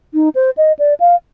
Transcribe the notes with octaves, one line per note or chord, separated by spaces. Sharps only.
D#4
C5
D#5
D5
F5